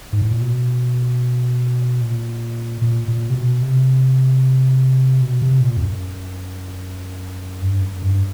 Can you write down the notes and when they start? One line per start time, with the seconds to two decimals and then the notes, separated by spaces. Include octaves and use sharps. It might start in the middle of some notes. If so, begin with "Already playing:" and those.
0.13 G#2
0.22 A2
0.31 A#2
0.41 B2
2.01 A#2
2.82 A#2
3.08 A#2
3.30 C3
3.35 B2
3.62 C3
5.21 B2
5.42 C3
5.61 A#2
5.77 F2
5.82 F#2
7.62 G2
7.82 F#2
8.02 G2